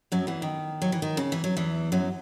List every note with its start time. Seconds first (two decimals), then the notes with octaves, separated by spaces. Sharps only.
0.12 F#2 F#3
0.27 E2 E3
0.42 D#3
0.82 F#3
0.92 E3
1.02 D#3
1.17 C#3
1.32 E3
1.44 F#3
1.57 E2 E3
1.92 F#2 F#3